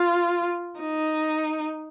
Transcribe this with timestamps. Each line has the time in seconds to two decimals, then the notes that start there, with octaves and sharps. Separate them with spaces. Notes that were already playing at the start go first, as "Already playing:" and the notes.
Already playing: F4
0.80 D#4